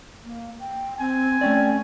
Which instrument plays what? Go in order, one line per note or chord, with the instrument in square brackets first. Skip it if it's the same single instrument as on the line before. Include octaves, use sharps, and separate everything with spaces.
[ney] A#3
G5
[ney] C4 [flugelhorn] G#5
[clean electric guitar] A3 C#4 D5 [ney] G5